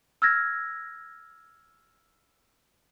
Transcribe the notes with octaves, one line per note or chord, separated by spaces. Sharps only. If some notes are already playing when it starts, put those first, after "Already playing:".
E6 F6 G#6 A#6